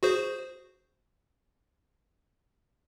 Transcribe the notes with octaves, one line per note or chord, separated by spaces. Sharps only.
F#4 G#4 C5